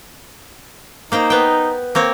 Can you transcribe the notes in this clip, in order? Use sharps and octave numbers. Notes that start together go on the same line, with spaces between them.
A#3 D#4 C5 G5
B3 G5
A#3 C4 C#5